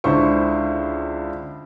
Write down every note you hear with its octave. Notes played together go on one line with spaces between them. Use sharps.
C#2 D3 E4 C5 C#6